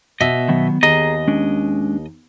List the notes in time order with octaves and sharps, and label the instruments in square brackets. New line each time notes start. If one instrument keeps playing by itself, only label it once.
[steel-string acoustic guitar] B2 [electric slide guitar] D#5 E5
[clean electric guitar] D#3 F#3 B3
[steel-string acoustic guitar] D#2 [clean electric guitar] G#4 A#5 [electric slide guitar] D#5
[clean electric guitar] G#3 C#4 D4